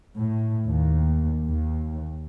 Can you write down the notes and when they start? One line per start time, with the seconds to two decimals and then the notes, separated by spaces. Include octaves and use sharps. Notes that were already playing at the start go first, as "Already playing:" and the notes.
0.18 A2
0.70 D#2
1.48 D#2